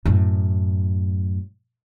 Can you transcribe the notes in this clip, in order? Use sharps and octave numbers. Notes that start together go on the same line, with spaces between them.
F#2 A2